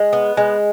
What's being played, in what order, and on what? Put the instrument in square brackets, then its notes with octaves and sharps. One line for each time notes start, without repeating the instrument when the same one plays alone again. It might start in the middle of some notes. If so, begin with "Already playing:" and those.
Already playing: [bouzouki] G#3
B3
G#3